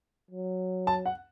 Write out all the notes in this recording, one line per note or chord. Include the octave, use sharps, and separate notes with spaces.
F#3
A5
F#5